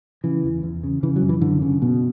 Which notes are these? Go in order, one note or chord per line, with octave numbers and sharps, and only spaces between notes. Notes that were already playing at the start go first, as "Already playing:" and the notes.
C#3 E3
E2
E2
C#3
C#3 E3
F#3
F#2
E3
F#2 D3
C#3
B2